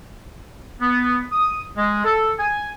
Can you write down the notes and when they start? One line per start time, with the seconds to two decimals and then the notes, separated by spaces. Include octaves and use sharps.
0.81 B3
1.32 D#6
1.77 G#3
2.04 A4
2.39 G#5